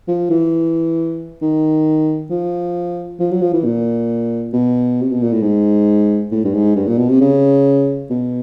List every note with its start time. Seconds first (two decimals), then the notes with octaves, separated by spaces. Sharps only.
0.08 F3
0.30 E3
1.42 D#3
2.30 F3
3.19 F3
3.31 F#3
3.41 F3
3.53 E3
3.65 A#2
4.53 B2
5.02 C3
5.12 B2
5.22 A#2
5.32 A2
5.42 G#2
6.32 A2
6.44 G2
6.54 G#2
6.76 G2
6.87 A#2
6.98 B2
7.09 C3
7.21 C#3
8.10 B2